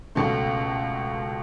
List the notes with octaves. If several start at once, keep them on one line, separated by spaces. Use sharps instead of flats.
C#2 B2 A3 C#4